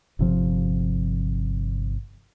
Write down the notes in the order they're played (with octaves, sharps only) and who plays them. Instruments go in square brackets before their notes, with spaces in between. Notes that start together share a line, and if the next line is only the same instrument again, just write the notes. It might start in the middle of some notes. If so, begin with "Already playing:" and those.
[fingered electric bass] G1 C3 F3